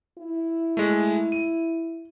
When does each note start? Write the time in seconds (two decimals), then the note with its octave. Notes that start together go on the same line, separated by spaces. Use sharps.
0.18 E4
0.77 G#3 A3
1.32 D#7